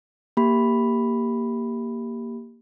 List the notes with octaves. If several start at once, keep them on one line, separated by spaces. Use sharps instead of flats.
A#3 G4 B5